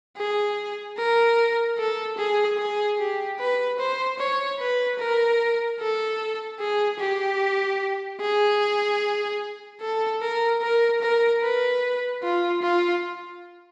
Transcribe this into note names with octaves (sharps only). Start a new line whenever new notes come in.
G#4
A#4
A4
G#4
G#4
G4
B4
C5
C#5
B4
A#4
A4
G#4
G4
G#4
A4
A#4
A#4
A#4
B4
F4
F4